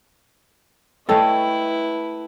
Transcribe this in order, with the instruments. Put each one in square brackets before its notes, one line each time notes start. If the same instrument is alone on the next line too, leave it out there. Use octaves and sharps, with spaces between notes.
[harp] A3 G5 A5 [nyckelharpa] E4 B4 [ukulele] A4 C#5 D#5